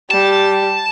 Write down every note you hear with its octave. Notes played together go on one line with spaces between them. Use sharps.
G3 A5